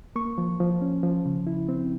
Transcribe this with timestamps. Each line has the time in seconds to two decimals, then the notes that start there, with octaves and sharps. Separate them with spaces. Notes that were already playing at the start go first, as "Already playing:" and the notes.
0.16 A#3 C#6
0.38 F3
0.60 F3
0.81 C#4
1.03 F3
1.26 C#3
1.47 E4
1.69 C4